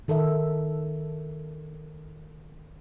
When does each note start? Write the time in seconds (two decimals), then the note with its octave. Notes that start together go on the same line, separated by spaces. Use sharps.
0.08 D#3 A4 A#4 E5